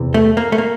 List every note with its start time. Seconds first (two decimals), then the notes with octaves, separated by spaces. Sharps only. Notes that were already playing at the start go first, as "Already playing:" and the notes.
Already playing: E2 C3 E3
0.14 A3
0.37 A#3
0.52 A3
0.58 A#3